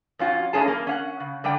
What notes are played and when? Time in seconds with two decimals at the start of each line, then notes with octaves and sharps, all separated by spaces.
0.19 F2 C#4 F4 F#4
0.53 G2 A3 C#4 E4 G#4 A5
0.68 A#3 C#4 A#4
0.87 C#4 F5 F#5
1.20 C#3
1.44 D3 G3 A3 G5